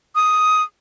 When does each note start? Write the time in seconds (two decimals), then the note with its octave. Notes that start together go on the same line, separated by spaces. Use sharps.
0.15 D#6